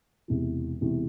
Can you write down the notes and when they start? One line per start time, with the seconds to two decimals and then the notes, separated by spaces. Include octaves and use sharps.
0.28 E1 E2 C3 E3
0.81 E1 E2 C3 E3